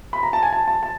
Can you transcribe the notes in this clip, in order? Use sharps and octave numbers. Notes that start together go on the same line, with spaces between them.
B5
A#5
A5
G#5
A5
A5
A5